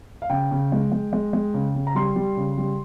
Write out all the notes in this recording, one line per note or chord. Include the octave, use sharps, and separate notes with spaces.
F5
C#3 G5
C#3
G#3
G#3
G#3
G#3
C#3
C#3
A#5
G3 C6
G3
C#3
G3